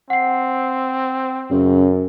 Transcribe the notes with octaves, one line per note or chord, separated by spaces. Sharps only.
C4 F#5 C7
F#2 C#3